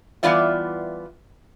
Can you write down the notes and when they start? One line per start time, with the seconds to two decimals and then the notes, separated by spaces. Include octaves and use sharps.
0.23 E3 G3 B3 F4 D5 E5